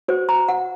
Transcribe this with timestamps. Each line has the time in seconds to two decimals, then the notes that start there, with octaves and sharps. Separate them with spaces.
0.08 F#4 C5
0.29 A#5
0.48 F#5